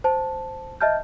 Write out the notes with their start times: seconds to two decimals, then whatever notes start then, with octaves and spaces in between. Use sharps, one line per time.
0.04 C5 A5
0.81 D#5 E5 A5 F6 G6